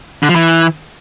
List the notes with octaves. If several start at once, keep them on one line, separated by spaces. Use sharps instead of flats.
D3
F3
E3